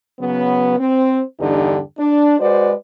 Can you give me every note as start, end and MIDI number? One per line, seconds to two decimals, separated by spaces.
0.20 0.75 49
0.20 0.75 54
0.20 0.75 59
0.79 1.21 60
1.40 1.78 40
1.40 1.78 43
1.40 1.78 50
1.40 1.78 63
1.40 1.78 67
1.98 2.39 62
2.40 2.73 56
2.40 2.73 66
2.40 2.73 71
2.40 2.73 72
2.40 2.73 74